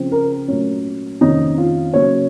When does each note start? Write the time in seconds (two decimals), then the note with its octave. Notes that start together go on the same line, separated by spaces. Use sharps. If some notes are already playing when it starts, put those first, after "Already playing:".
Already playing: C#3 F3 C4
0.12 A#4
0.48 A#2 F#3 A3 C#4
1.21 F2 C3 D#3 A#3 C#4 D#4
1.58 F4
1.93 C#3 F#3 A#3 C#4 C#5